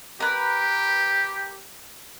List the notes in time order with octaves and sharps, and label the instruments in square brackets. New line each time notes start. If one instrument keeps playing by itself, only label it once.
[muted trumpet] G4 [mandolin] A#4 B4